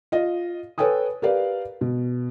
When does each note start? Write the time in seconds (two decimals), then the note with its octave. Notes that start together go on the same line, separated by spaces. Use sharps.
0.12 F4 D#5
0.78 A4 B4 C#5 G5 G#5 D#6
1.22 G4 A#4 B4 D5 F5
1.81 B2